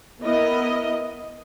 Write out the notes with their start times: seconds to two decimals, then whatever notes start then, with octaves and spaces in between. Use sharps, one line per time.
0.23 B3 E4 A#4 D#5